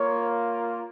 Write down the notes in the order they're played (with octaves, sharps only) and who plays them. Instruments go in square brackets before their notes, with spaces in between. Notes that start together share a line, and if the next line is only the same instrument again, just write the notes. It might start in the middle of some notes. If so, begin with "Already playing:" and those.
Already playing: [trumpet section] A#3 F4 C#5